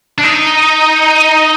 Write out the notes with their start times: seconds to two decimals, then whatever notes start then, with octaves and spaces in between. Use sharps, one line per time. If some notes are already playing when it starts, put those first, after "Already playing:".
0.18 D4
0.24 D#4